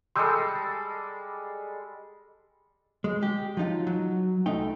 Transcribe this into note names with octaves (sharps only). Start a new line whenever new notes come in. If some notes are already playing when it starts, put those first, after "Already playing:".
G3 G#3 A4 C6 E6 G6
G#3
G4
F3 F#3 D#4 F4
F#3
C2 A3 D#4 G5